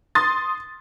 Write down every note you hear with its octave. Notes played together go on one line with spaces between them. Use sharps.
C6 D#6 A6